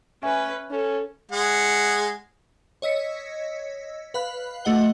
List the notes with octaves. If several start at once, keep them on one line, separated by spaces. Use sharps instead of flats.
C#4 B4 E5 G#5 C#6
C#4 A4
G#3 G#4 F#5
C#5 D#5 E6 B6 C#7
B4 F5 B5 F#6
A3 F#4 D#5 F#5 G7